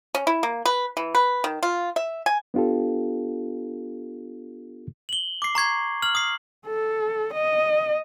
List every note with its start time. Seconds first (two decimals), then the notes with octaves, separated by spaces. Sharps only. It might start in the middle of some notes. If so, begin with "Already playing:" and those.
0.15 C#4
0.27 E4
0.43 A#3
0.66 B4
0.97 E3
1.15 B4
1.44 D#3
1.63 F4
1.96 E5
2.26 G#5
2.54 B3 D4 F4 G4 A4
5.09 F#7 G7
5.42 D6 C7
5.55 A#5 C#6 G#6 C7
6.02 F6 F#7
6.15 D#6 C7
6.67 A4
7.34 D#5